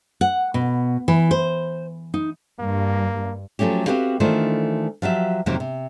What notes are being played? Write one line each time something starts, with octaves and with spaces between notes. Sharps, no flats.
F#5
B2
E3
C5
D#4
G2 A#3
F3 F#3 A3 C#4 G4
C4 D4 F#4 G4 B4 F5
D#3 E3 A3 D4 F4 C5
F3 F#3 G4 E5
F2 C3 D#3 F#3 A#3 C4
C3